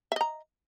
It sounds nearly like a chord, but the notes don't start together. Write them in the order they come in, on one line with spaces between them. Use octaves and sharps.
E5 D#5 A#5